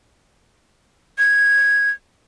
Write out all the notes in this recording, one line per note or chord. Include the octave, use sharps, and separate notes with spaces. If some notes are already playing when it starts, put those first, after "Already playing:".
G#6